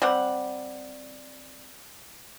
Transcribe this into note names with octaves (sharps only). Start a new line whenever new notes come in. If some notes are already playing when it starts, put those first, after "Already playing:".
G3 C4 F#5